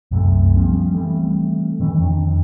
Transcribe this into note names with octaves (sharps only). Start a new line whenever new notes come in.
C2 F#2 C3 A3
F3 G3 B3 C#4
E3 G3 A3 C4
D#3 E3 C#4
F2 D#3 D4